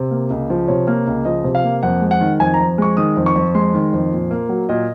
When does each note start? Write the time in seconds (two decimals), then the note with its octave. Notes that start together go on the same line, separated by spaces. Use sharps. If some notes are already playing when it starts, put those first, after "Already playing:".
Already playing: C3
0.11 A#3
0.30 C#2
0.50 F3
0.68 C3 C#5
0.87 A#3
1.07 C#2
1.25 F3 D#5
1.44 C3
1.55 F5
1.64 A#3
1.83 F2 F#5
2.02 G#3
2.11 F#5
2.21 D#3
2.40 F2 G#5
2.54 A#5
2.60 F2
2.78 G#3 C#6
2.97 D#3 D#6
3.17 F2
3.26 C#6
3.36 F2
3.55 G#3 C6
3.74 D#3
3.93 F2
4.12 A#2
4.31 A#3
4.49 F#3
4.69 A#2 D#5